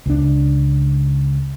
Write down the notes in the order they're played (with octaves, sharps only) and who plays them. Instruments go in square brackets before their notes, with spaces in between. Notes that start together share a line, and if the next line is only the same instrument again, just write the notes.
[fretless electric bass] C#2 D4